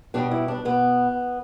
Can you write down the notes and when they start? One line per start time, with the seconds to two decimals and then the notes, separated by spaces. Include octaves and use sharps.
0.14 B2 G3 D4
0.31 E4
0.48 D4
0.65 B2 B3